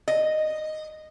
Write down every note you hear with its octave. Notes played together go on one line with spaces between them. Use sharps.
D#5